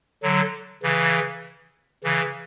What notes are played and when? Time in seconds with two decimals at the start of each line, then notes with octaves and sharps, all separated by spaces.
0.23 D3 F#3
0.83 C#3 E3
2.04 C#3 E3